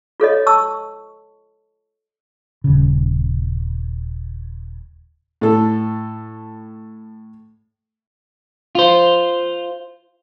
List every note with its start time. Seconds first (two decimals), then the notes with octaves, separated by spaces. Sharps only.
0.20 F4 A4 C#5 D#5
0.47 A5 C#6 E6
2.64 D#1 C#3
5.41 A2 A4
8.75 F4 C5